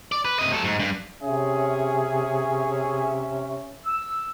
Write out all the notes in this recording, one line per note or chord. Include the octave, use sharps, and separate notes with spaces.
D5
B4
C3 D#5
F#3 A4
G#2
G2
C3 C#4 G#4 E5
E6